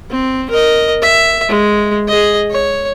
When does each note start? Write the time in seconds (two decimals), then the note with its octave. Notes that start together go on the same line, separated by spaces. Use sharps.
0.10 C4
0.50 A#4 D#5
1.02 E5
1.49 G#3
2.08 G#4 D#5
2.51 C#5